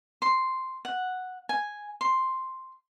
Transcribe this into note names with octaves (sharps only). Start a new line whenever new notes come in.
C6
F#5
G#5
C6